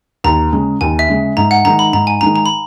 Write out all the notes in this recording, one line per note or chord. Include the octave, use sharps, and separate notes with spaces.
D#2 A#5
C#3 G#3
D#2 G#5
E5
C#3 G#3
G#2 A#5
F#5
D#3 G#3 D#4 A#5
B5
G#2 A#5
G#5
D#3 G#3 D#4 A#5
A#5
B5